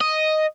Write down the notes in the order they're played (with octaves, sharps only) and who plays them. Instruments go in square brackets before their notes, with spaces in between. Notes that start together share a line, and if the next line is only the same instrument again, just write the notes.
[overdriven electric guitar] D#5